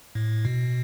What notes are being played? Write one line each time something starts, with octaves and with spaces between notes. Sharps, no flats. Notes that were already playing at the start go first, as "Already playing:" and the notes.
A2
B2